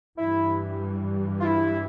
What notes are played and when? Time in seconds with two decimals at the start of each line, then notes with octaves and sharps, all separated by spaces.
0.18 G2 E3 G3 E4
1.40 F4
1.44 E4